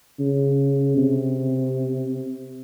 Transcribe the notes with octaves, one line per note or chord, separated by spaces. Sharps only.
C#3
C3